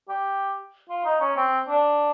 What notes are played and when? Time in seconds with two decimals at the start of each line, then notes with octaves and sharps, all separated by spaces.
0.09 G4
0.89 F4
1.05 D#4
1.21 C#4
1.37 C4
1.68 D4